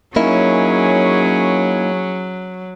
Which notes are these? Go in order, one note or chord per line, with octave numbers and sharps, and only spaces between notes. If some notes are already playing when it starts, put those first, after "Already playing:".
F#3 A#3 C#4 D#4 E4 G#4